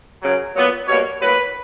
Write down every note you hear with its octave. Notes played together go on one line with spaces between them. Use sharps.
F#2 C#3 F#3
A#2 F#3 B3
B2 G3 A#3 C#5
A2 F#3 A#3 B4